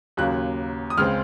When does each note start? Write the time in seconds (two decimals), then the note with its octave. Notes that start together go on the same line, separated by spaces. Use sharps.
0.17 D#2 C#3 F#3 A#3 C#4 F#6
0.90 D#6
0.97 C#2 C#3 G#3 C4 F6